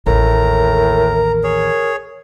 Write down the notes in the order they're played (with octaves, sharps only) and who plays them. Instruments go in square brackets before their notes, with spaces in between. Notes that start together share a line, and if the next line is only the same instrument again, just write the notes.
[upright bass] A1 D#2 [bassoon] A2 [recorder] A#4 [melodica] A#5
[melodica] G#4 C#5